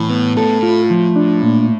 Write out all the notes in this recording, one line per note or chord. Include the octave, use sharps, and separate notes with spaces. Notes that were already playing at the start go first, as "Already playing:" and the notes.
Already playing: A2 E3
B3
A2 A4
F4
F3
D4
A#2